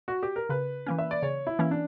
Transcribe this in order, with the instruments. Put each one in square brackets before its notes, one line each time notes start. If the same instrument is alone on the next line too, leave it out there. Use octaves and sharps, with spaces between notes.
[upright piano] F#4
G4
A#4
[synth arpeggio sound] C#3 [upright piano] B4
[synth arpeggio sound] E3 A#3 C#4
[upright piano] E5
D5
[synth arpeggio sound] C#3 [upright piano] C#5
[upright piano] E4
[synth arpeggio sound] E3 A#3 C#4
[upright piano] D4